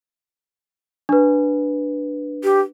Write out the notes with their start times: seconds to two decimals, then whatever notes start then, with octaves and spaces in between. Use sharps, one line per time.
1.09 D4 B4
2.44 G4